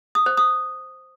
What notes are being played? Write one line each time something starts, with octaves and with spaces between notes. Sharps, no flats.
D#6
C5
D#6